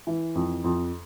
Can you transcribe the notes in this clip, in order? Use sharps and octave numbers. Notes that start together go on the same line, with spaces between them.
E3
F2
F2